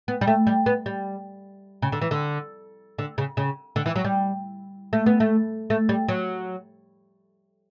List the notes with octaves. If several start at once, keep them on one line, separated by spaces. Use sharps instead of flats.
B3
G3
A3
G3
B3
G3
C#3
D3
E3
D3
D3
C#3
C#3
D3
E3
F#3
G3
A3
B3
A3
A3
G3
F#3